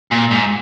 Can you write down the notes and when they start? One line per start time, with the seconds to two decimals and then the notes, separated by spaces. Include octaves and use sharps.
0.12 A#2
0.31 G#2